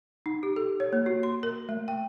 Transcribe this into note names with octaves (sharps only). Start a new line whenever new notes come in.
D#4
G4
A4
C#5
A#3
F#4
C6
A#4
A3
G5